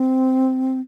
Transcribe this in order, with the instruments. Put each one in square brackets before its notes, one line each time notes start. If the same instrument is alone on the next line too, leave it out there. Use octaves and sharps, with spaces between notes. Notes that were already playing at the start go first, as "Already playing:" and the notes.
Already playing: [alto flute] C4